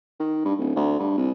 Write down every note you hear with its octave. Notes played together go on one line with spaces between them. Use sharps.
D#3
G2
D1
D2
G2
C2